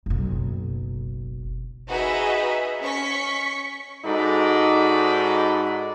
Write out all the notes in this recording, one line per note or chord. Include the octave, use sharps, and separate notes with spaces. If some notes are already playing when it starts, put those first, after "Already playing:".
F#1 B1
D#4 F#4 G#4 B4 D#5 E5
C#4 C#6 B6 C#7
G#2 D#4 F#4 A4 D5 B5